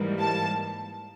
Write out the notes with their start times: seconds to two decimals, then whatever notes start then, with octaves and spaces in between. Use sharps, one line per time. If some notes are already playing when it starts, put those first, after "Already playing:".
Already playing: G#2 E3 G3 A#3
0.20 A5